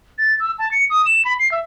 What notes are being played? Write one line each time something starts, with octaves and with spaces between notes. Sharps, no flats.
A6
E6
A5
C#7
D#6
E7
B5
C7
E5